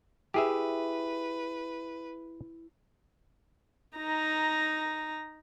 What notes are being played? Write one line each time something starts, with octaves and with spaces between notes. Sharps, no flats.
E4 G4 G#4 B4 E5
D#4 A#5